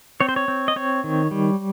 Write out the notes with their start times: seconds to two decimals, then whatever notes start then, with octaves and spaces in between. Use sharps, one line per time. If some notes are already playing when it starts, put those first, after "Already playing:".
0.21 C4 C#5
0.29 C5
0.36 C#5
0.48 C4
0.68 D#5
0.76 C4 C#5
1.04 D#3
1.31 G3